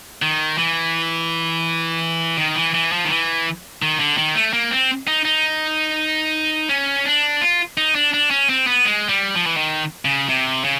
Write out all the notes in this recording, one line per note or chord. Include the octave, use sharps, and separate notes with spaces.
D#3
E3
D#3
E3
E3
F3
D#3
E3
D#3
D3
D#3
A3
A#3
C4
D#4
D#4
C#4
D4
F4
D#4
D4
D4
C#4
C4
B3
G#3
G3
F3
E3
D#3
C#3
C3
C#3